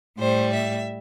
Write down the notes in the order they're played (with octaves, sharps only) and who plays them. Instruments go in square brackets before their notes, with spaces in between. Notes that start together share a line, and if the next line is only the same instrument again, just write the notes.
[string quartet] A2 G3 C5
E5